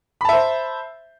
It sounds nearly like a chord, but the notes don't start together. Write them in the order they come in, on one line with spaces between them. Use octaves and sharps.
B5 A5 E5 C5